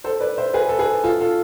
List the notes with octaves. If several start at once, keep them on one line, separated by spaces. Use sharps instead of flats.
A4 C5
B4 D5
C5 E5
G#4 B4
A4
G#4 B4
F4 A4
F4 A4